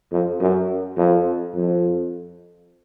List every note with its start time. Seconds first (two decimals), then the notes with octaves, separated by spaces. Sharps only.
0.12 F2
0.40 F#2
0.97 F2
1.54 F2